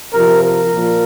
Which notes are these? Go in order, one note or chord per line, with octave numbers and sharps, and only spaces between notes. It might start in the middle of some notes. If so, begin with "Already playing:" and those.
C3 F3 A#4
A#4
A#2 F3